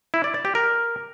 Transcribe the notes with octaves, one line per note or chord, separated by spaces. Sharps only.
E4
D5
D5
G4
A#4